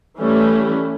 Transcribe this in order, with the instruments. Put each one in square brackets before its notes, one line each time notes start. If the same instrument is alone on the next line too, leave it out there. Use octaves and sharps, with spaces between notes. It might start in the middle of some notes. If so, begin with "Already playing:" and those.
[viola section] E3 G3 A3 C#4